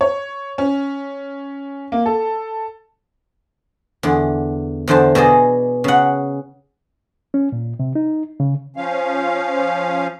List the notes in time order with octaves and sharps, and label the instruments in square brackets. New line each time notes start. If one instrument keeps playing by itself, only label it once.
[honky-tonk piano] C#5
C#4
A#3
A4
[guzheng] E2 D3
E2 D3 C5 A5
B2 G#4 D5 D#5
C#3 F#5
[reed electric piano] C#4
A#2
C3
D#4
C#3
[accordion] F3 C#4 F5